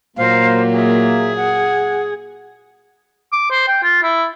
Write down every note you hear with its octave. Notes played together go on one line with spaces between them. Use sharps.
A#2 F#3 A#3 A#4 C5 F5
G#4 E5
F#5
D6
C5
G5
F4
E4